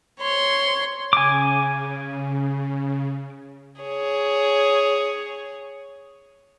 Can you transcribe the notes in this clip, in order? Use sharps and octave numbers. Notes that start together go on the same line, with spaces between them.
C#5 C6
C#3 G#5 D6
G#4 C#5